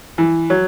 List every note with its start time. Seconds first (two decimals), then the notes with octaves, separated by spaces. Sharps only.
0.18 E3
0.50 F#3